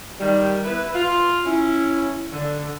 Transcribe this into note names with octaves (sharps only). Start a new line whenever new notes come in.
D#3 G3
E4 B4
F4
C#4 E4
D3